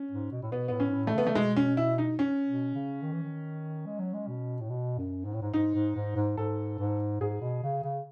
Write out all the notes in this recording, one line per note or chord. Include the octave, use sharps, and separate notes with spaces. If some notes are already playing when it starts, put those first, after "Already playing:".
Already playing: C#4
G#2
B2
A2
B2 B3
A2 B3
C#4
G#2
A2
A3
C#3 B3
A3
B2 G#3
C#4
E4
D#4
C#4
B2
C#3
D#3
E3
D#3
G#3
F#3
G#3
B2
A2
B2
F#2
G#2
A2
G#2
G#2 D#4
G#2
G#2
G#2
G#2 A4
G#2
G#2 G#4
B2
C#3
C#3